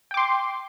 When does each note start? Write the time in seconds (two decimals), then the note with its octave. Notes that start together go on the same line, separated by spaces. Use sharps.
0.11 G5
0.14 D6
0.17 C6